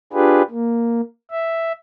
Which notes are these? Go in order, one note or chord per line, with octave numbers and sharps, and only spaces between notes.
D4 F4 G4 G#4 B4
A#3
E5